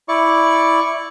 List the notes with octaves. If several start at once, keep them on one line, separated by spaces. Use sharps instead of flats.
E4 D5 C#6